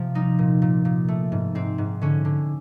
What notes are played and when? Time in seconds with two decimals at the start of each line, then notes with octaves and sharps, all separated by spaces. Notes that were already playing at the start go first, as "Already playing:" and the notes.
Already playing: C3 F3
0.15 G3 D#4
0.39 A#2
0.62 A#2
0.85 A#2
1.08 A3
1.32 G#2
1.55 G#2 C4
1.78 G#2
2.02 D3 C#4
2.25 D3